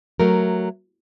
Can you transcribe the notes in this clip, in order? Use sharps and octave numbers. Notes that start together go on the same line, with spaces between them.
F#3 A3 A#4